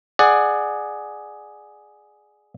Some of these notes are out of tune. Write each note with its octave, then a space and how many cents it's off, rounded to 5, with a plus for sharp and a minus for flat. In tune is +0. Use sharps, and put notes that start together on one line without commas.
G#4 +5 D5 +20 F#5 +0